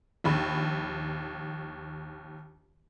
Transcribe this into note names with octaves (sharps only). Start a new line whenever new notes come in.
A#1 D#2 B5